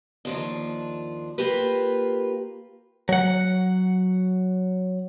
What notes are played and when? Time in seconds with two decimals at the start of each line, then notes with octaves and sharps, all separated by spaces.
0.25 D#2 F3 D4
1.38 A#3 F4 G4 B4
3.09 F#3 F#5